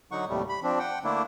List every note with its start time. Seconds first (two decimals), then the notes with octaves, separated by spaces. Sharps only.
0.11 D3 F#3 D#4 F#5 C#6
0.28 D#2 A2 C3 G3 A3
0.49 B5
0.63 F3 C4 D4
0.79 F#5 G5
1.04 D3 A3 A#3 D4 E4